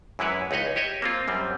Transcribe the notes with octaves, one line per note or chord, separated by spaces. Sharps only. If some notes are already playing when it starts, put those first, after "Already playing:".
F#2 E3 G#3 E4 B4 C#5
C#2 D#4 B4 C#5 D#5
G4 C#5 D#5 E5
A#3 C4 F4
F#2 G3 C4